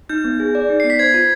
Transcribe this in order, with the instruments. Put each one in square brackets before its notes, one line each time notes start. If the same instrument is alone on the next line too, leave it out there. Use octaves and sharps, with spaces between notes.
[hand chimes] D#4 [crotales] G6
[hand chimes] B3
G#4
D5
D#4
[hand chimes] B3 [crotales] C7
[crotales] B6
[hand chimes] C5 [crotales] G#6
[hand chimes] F4